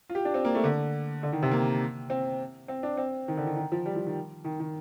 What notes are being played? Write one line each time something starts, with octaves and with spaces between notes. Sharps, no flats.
F4
G4
D4
C4
A#3
A3
D3
D3
D#3
C3
A#3
C4
C4
D4
C4
D#3
D3
D#3
D#3
F3
G3
F3
D#3
D#3
D#3